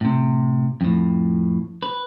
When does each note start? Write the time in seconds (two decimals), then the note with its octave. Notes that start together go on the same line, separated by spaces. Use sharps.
0.01 A2 C3
0.81 F2 A2
1.83 B4